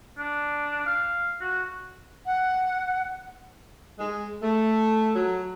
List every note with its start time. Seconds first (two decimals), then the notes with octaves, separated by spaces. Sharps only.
0.18 D4
0.86 F5
1.41 F#4
2.26 F#5
3.99 G#3
4.43 A3
5.16 F#3